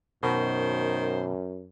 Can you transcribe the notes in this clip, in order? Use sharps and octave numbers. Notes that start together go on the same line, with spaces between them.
F#2 B2 D#3 C5